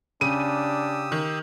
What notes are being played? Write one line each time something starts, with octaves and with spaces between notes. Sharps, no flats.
C#3 D4 G4 D#6 E6 D#7
D#3